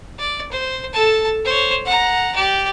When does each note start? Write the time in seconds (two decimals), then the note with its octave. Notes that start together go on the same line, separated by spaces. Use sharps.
0.19 D5
0.52 C5
0.93 A4 A5
1.45 C5 C#5
1.86 F#5 A#5
2.35 G4 D5